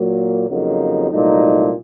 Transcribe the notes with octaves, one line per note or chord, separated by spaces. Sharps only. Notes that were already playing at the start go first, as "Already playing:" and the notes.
Already playing: A#2 F#3 A#3
F2 C#3 F#3 A#3 D#4
C2 A#2 F#3 A3 D#4